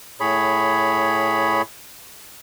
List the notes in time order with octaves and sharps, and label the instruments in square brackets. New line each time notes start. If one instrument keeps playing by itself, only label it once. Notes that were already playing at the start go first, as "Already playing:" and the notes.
[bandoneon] A2 G#4 C#5 B5